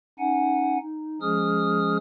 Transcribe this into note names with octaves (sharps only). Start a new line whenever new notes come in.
C#4 D#4 F#5 G#5
D#4
F3 G#3 C#4 G#4 D#6 F6